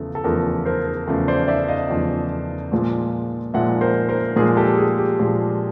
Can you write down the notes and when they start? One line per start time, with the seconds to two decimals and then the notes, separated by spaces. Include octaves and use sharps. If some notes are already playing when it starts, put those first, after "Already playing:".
Already playing: E2 C#3 F3 A3 A4
0.15 A4
0.24 E2 C#3 F3 A3 G#4 A#4
0.65 A#4 C5
1.07 E2 C#3 F3 A3
1.28 C5 D5
1.48 D5 E5
1.68 D#5 F5
1.90 E2 C#3 F3 A3
2.72 A#2 F3 G#3
3.54 A#2 F3 G#3 E5 F#5
3.81 A#4 C5
4.09 A#4 C5
4.36 A#2 F3 G#3 G#4 A#4
4.57 G4 A4
4.78 G#4
4.98 G4
5.19 A#2 F3 G#3 G#4